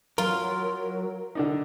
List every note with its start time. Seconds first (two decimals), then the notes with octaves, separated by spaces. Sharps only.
0.18 F#3 F4 A#4
1.35 D3 D4 D#4